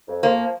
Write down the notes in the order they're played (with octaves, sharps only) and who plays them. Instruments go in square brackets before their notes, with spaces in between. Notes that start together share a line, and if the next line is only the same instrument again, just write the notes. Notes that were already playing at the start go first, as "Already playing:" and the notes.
[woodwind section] F2
[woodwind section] F3 [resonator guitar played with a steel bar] A#3